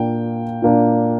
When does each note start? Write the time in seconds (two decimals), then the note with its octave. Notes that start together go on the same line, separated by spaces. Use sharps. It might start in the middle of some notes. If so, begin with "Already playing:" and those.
Already playing: A#2 A#3 D4 G5
0.62 A#2 A#3 D4